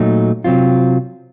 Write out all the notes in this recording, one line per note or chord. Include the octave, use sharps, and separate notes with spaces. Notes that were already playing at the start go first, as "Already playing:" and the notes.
Already playing: A#2 F#3 A3 D#4
C3 F#3 C4 F4